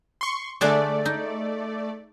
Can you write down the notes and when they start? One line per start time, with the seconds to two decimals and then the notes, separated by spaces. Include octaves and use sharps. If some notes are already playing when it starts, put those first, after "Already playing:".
0.21 C6 C#6
0.61 D3 A3 D4 G#4 D5
1.05 D#4